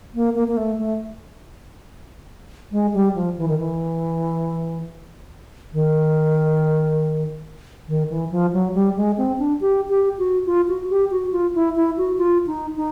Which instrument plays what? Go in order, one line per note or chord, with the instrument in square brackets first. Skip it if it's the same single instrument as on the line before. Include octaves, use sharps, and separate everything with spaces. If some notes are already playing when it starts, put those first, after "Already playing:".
[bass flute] A#3
A#3
A#3
A3
A3
G#3
G3
F3
E3
D#3
E3
D#3
D#3
E3
F3
F#3
G3
G#3
C4
D4
G4
G4
F#4
F4
F#4
G4
F#4
F4
E4
E4
F#4
F4
D#4
D#4